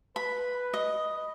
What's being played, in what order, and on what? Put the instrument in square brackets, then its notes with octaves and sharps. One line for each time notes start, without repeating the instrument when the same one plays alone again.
[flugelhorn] B4 [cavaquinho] B5
[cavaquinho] D#5